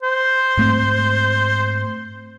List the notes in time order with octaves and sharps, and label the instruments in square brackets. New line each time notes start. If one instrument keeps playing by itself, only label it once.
[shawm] C5
[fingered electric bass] G#2 A3 C4